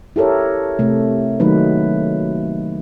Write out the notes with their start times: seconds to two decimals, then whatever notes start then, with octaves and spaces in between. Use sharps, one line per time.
0.16 E4 G4 A4 A#4 C#5
0.79 C3 A3
1.40 D#3 F#3 A3 A#3 D#4 B4